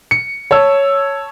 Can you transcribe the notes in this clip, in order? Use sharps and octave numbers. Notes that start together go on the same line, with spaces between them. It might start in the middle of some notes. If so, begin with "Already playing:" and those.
C#7
C#5 A5 E6